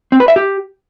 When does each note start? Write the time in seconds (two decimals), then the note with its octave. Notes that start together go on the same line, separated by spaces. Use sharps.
0.12 C4
0.20 B4
0.28 E5
0.36 G4